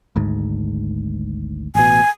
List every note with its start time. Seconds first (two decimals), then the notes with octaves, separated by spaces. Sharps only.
0.16 G#1 D2 G#2
1.75 A1 B2 G#5